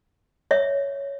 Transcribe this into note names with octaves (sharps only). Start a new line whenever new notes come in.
C#5 E5